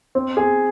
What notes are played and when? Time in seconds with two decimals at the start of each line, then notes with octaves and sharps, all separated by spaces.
0.15 C4
0.37 G#4